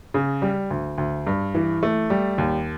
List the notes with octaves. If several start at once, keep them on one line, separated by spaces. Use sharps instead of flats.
C#3
G3
D2
D2
G2
E3
A3
G3
D#2